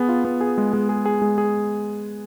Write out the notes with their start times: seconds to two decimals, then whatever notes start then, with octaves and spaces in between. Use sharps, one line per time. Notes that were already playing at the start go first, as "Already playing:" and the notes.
Already playing: B3 G#4
0.09 F4
0.25 B3
0.41 G#4
0.58 G#3
0.73 G#3
0.89 G#4
1.05 G#4
1.22 G#3
1.38 G#4